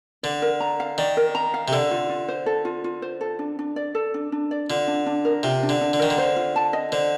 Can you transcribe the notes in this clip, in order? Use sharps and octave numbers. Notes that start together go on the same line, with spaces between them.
D3 D5
A#4
A#5
F5
D#3 D5
A#4
A#5
F5
C3
D3 A4
F4
F4
C5
A4
F4
F4
C5
A4
D4
D4
D5
A4
D4
D4
D5
D3 F4
D4
D4
A#4
C3 F4
D4
D3
D4
D3
D#3 A#4
D3
C5
F4
A5
D#5
D3 C5